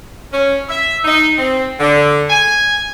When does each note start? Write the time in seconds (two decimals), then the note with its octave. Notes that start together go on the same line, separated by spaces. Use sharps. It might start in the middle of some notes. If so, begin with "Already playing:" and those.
0.32 C#4
0.68 E5
1.05 D#4
1.37 C4
1.79 D3
2.30 G#5